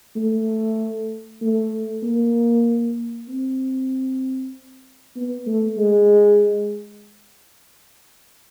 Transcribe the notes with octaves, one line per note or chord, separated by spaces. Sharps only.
A3
A3
A#3
C4
B3
A3
G#3